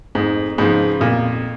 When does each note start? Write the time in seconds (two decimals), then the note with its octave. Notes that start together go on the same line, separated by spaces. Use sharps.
0.15 F2 G#2
0.58 G#2 C#3 F3 G#3 B3
1.00 F2 A#2